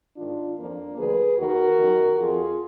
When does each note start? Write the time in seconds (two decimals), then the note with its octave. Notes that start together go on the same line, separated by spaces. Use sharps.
0.17 G#2 D#3 D4 F4
0.57 F2 F3 A#3 D4
0.98 D2 D3 F3 G#4 B4
1.38 D#2 D#3 F#4 A#4
1.79 F#2 D#3
2.18 F2 F3 F4 G#4